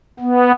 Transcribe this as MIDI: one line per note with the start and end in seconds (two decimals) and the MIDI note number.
0.20 0.52 59